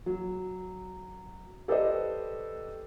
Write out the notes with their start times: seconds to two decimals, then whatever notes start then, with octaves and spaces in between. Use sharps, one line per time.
0.06 F#3
1.68 G4 A4 B4 C5 D5 D#5